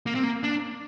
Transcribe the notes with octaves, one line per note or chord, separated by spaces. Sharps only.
A#3
C4
A#3
D4